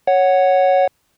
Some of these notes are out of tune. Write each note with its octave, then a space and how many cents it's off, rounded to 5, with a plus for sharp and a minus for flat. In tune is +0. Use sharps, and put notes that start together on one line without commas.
C#5 +0 F#5 +0